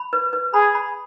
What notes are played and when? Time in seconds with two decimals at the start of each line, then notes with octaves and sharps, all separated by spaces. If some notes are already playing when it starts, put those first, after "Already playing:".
Already playing: B5
0.13 B4
0.33 B4
0.54 G#4 B5
0.75 B5